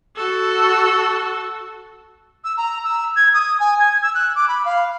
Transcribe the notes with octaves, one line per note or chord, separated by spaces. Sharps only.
F#4 A4
E6
A#5
E6
G#6
D#6
G#5
G#6
E6
F#6
D6
B5
F5